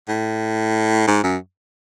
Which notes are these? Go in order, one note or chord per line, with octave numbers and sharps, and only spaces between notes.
A2
G#2
F#2